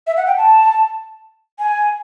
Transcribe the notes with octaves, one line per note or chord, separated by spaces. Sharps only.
E5
F#5
G5
A5
G#5